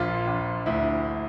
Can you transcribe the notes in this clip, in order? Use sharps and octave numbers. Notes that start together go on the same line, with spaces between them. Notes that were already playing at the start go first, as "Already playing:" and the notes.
Already playing: A#1 A#2 F4
A#1
D2 E4